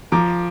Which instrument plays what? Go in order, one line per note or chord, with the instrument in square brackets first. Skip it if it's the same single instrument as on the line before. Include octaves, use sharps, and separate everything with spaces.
[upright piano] F3 A#5 D6